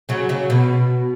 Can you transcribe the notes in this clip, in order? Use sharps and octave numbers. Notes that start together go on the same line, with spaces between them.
C#3 F#3
C#3 F#3
B2